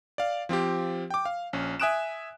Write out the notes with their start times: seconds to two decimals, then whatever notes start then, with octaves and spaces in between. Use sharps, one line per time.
0.18 D5 F5
0.49 F3 C4 F4 G4
1.10 G5 D6
1.25 F5
1.53 A#1 C#4
1.80 E5 G#5 D#6 F#6 D7 E7